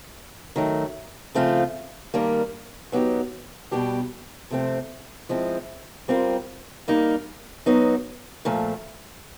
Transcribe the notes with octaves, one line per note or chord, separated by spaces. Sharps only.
D#3 F#3 A3
C#3 F3 A3 C4 F4
D#3 G3 A#3 D4
F#3 B3 D#4 G4
B2 G3 B3 D4 G4
C3 F3 A3 C4
F3 G#3 C4 E4
G3 C4 F4 A#4
G3 A#3 D#4
F#3 B3 D#4
A#2 F3 A3